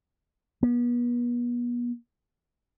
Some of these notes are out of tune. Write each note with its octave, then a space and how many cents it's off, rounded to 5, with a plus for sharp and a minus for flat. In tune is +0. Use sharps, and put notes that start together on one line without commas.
B3 -35